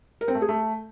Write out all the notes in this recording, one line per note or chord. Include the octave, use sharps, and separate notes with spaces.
A#4
C4
A3
G#4
A3